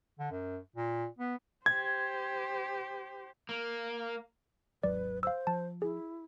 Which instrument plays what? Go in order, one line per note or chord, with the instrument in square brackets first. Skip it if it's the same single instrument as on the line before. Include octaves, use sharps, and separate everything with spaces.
[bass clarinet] D3
F#2
A#2
B3
[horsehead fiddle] G4 C5 [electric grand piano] G#6
[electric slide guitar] A#3
[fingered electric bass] G#1 D#2 F#3 [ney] B4 [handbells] D5
[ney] C5 [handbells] F5 E6
[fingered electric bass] F3 [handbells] A5
[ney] E4 [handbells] G#4